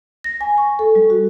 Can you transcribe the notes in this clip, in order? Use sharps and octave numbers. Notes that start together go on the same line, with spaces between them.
A#6
G#5
C#6
A4
G3
F#4